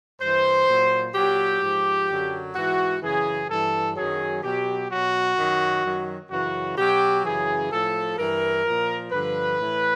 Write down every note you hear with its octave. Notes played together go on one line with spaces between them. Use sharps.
G2 E3 C5
A#2 F#3
A#2 F#3 G4
G#2 F3
F#2 D3 F#3
G#2 E3 F#4
F#2 C#3 E3 G#4
G2 E3 A4
F#2 D#3 F#3 G#4
B2 F#3 G4
B2 F#3 F#4
F#2 D#3 F#3
F#2 D#3 F#3
F#2 C#3 E3 F#4
B2 F#3 G4
F#2 C#3 E3 G#4
A2 F3 A4
G2 E3 A#4
A#2 F3
G2 D3 F3 B4
A2 E3